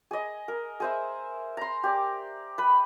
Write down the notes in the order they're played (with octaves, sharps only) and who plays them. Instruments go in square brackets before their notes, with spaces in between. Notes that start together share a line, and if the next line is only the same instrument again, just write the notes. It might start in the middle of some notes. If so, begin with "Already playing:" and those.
[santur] G#4 D#5
A#4
G#4 C5 E5
A#5 C6
G4 D5
B4 B5